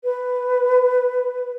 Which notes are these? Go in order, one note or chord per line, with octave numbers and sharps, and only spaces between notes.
B4